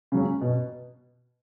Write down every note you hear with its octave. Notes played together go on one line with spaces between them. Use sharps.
C#3 F#3 C#4
B2